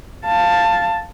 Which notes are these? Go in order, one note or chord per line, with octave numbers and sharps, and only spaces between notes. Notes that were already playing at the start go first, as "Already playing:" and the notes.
F5 A5